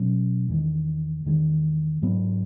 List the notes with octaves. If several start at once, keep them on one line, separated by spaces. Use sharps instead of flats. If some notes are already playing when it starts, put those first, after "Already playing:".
Already playing: B2 F#3 C#4
E2 D#3 G#3
E2 D#3 G#3
G#2 F#3 B3